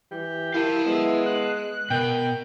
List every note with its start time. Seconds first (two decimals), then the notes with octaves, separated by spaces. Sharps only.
0.11 E3 G4
0.54 E4 A#4 F5 A5
0.86 G#3 B3
1.26 F#6
1.90 B2 A#4 G5